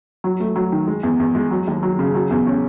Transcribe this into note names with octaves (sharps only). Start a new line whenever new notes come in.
F#3
A3
F#3
D#3
G#3
E2
E2
G#3
F#3
D#2
F#3
C#3
F#3
E2
C#4